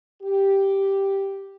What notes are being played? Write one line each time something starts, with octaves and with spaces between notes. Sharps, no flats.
G4